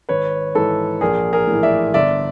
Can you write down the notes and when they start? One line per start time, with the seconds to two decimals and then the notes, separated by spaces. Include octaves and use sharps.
0.09 G#1 B4 C#5
0.55 G#2 E3 A4 B4
1.01 A#1 G#4 A#4
1.33 G#4 A#4
1.47 A2
1.52 E3
1.63 D5 E5
1.94 G1 D5 E5